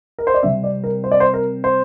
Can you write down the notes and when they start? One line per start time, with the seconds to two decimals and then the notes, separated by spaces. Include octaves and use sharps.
0.19 A#4
0.27 C5
0.34 D5
0.43 C3 G3 C4 E5
0.64 D5
0.84 A#4
1.04 C5
1.11 D5
1.20 C5
1.34 A#4
1.64 C5